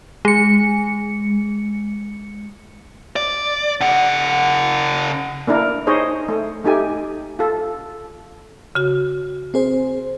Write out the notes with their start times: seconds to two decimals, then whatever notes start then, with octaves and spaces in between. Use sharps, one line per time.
0.25 G#3 C#7
3.16 D5
3.81 C#3 F#5
5.47 A#3 D4 E4 A#4
5.87 D#4 G#4 C5 C#5 D#5
6.28 A3
6.65 A3 D#4 G4 G#5
7.39 F4 A4
8.75 C#3 F#4
9.54 C4 G#4 C5